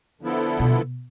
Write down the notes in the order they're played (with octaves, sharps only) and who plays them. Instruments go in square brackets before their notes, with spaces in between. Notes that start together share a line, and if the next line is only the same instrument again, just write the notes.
[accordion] D3 F3 B3 E4 A4
[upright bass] B2